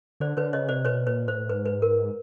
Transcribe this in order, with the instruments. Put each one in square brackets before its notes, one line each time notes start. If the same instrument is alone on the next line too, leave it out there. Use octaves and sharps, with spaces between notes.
[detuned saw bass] D3 [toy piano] C5 D5
[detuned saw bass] D3 [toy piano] B4 C#5
[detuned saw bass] C#3 [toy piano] C#5 D#5
[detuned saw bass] C3 [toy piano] C5 D5
[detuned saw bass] B2 [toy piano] B4 C#5
[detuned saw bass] A#2 [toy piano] B4 C#5
[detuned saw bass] A2 [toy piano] C5
[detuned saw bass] G#2 [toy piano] B4
[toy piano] B4
A#4